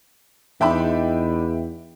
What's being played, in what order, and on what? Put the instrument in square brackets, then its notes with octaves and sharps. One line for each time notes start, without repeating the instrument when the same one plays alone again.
[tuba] E2 [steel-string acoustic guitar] D4 D#4 [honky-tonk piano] E5 G5 B5